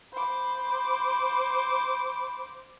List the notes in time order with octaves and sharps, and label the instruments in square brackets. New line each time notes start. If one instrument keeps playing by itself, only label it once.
[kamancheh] C5 D6 [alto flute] B5